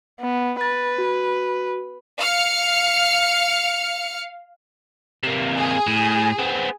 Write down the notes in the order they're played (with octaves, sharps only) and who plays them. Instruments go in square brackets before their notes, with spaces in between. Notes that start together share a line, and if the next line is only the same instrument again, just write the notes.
[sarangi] B3
[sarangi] B4 [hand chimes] A6
[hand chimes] F#4
[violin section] F5 F6 C#7
[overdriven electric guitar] C3 A#3
[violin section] G#4
[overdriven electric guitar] A2
B3 C4